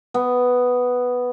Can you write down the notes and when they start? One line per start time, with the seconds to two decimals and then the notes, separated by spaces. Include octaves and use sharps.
0.14 B3